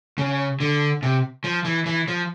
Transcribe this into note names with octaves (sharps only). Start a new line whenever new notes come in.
C#3
D3
C3
F3
E3
E3
F3